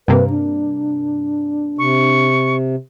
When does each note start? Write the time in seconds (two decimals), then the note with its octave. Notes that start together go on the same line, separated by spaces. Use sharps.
0.08 G2 C3 A#3 B4
0.30 D4
1.78 C3 C#6